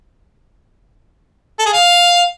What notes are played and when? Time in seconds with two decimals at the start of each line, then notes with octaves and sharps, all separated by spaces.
1.59 A4
1.66 G#4
1.73 F5